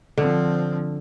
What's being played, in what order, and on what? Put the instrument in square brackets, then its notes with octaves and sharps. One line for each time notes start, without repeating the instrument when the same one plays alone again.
[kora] D3 [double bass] F3 C4